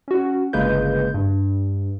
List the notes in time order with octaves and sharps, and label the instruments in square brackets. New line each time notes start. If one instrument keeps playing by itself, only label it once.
[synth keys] C#4 F#4
G1 C#3 G#3 A#3 B4 G6
G2